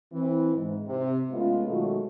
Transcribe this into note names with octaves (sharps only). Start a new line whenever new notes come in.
E3 C4
G#2
C3
G#3 A3 B3 C#4 F4
B2 D#3 F#3 G#3 A3 F#4